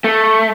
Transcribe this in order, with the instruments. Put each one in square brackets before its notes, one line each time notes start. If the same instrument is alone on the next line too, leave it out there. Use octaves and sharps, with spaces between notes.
[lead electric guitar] A3